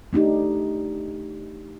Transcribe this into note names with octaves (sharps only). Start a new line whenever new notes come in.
A3 D4 D#4 G4